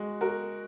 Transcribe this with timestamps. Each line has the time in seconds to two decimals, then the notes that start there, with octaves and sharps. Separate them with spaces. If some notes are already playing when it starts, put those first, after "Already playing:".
Already playing: G#3 F#4
0.21 F#4 A#4